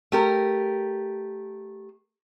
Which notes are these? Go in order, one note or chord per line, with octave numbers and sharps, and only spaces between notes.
A3 G4 A#4